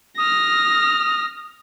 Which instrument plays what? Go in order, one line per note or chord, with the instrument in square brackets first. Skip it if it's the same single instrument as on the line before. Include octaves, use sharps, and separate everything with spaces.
[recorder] D#6 [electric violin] F6 A#6